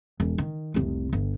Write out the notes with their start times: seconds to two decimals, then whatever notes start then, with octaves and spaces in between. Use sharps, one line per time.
0.20 E1
0.38 D#3
0.74 F1 C2
1.13 G1